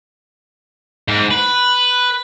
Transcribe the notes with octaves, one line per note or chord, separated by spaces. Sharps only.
G#2
B4